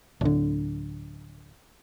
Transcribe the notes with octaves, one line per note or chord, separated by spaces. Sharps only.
D1 D3